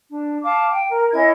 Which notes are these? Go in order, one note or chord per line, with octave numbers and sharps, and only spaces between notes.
D4
F5 A5 D6
G5
A#4
C#4 E4 D#5 G#6